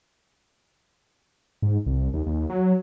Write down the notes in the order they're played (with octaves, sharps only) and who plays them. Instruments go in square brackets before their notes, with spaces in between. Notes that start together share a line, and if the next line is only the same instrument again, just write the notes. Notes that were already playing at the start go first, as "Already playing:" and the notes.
[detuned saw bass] G#2
C2
D#2
D#2
F#3